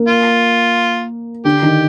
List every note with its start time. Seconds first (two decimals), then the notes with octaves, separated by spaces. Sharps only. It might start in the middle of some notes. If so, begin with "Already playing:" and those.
Already playing: A#3
0.08 F4
1.45 D3 D4 G4
1.62 D#3 D#4